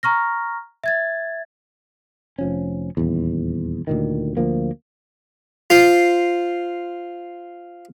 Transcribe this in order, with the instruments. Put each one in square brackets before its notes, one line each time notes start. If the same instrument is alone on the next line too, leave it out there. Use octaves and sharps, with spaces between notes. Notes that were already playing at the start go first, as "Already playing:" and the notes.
[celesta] A#5 C#6 F6 A#6
E5 G#6 A6
[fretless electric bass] F1 F3 C#4
D#1 E2
D2 A#2 D#3
D2 F3 A#3
[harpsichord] F4 C5